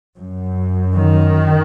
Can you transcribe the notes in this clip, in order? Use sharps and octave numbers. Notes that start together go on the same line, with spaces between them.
F#2
D#3